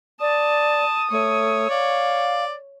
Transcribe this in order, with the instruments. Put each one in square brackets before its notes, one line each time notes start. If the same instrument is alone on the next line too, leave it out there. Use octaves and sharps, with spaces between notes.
[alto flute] D5 [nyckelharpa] A5 [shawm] D#6
[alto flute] A3 [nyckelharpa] C#5
[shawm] D5 [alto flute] F5